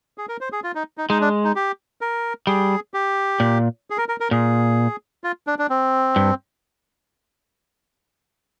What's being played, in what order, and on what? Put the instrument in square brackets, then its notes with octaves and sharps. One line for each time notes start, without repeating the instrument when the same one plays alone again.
[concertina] G#4
A#4
C5
G#4
F4
D#4
D#4
[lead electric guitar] G#3 [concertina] D#4
[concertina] D4
D#4
G4
A#4
[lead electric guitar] G3 [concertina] G#4
[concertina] G4
[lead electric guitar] A#2
[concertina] G#4
A#4
A#4
A#4
[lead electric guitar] A#2 [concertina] G#4
[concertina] F4
D4
D4
C4
[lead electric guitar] G2